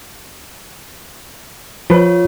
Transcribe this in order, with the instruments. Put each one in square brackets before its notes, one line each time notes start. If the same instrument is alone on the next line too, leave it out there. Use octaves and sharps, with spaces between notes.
[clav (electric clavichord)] F3 B4 [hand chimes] F4 C#5